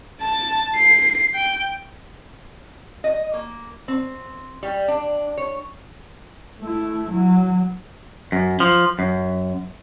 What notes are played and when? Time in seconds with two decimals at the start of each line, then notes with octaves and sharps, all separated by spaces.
0.22 A5
0.76 C7
1.35 G5
3.04 D#5
3.34 A#3
3.88 C4
4.63 G3
4.88 D4
5.37 C#5
6.60 A3 E4
7.11 F#3
8.32 F#2
8.60 F3
8.99 F#2